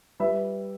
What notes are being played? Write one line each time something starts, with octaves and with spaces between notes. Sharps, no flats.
G3 B4 E5